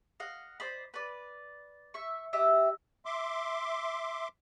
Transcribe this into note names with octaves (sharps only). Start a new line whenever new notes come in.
D#5 F5 F#5
C5 D5 D#5 B5
B4 D5
E5 C#6
G4 D#5 E5
E5 C6 D6